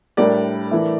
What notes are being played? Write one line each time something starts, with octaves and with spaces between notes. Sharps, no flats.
A2 G3 D4 A#4 D5
E3 A3 E4